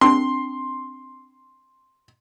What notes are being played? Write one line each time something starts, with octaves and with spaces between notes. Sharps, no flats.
C4 D4 C6